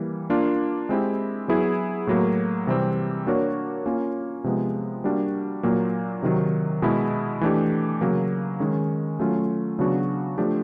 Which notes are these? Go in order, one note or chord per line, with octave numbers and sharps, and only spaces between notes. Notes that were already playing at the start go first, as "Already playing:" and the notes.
Already playing: E3 G3 A#3
A#3 D4 F4
G#3 C4 E4 G4
F#3 B3 E4 G#4
A2 F#3 A#3
C3 E3 G3 C4
A#3 D4 F#4 A#4 C#5
A#3 C#4 F4
C3 F3 G#3 B3
G3 A#3 D4 F#4
A#2 F#3 A#3
C3 D#3 F#3
B2 G#3 B3 E4
E3 A3 D4 G4
C#3 F#3 A#3
D#3 G#3 C#4
F#3 A3 C#4 F4
C#3 F#3 B3 D4 F#4
F3 A3 D4 G4